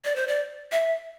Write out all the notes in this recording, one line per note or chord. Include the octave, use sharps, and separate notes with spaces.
D5
C5
D5
E5